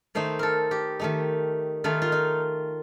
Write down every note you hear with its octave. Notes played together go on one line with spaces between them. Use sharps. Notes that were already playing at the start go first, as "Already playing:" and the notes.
D#3 A3 D#4 C5
A4 A#4
G4
D#3 A3 D#4
D#3 A3 D#4 F4
F4
D#4